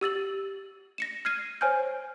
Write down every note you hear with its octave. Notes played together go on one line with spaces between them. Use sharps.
G4 E6 A6 F#7
A#6 C#7 E7
F6 G#6 C7 D#7
C5 C#5 G#5 F6 G6